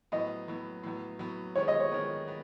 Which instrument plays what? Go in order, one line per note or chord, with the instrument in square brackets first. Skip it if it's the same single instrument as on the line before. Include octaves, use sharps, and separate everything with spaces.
[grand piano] A2 F#3 B3 [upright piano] D#5
[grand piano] A2 F#3 B3
A2 F#3 B3
A2 F#3 B3
[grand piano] D#3 G#3 B3 [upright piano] C#5
[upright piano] D#5
C#5
[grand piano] D#3 G#3 B3
B3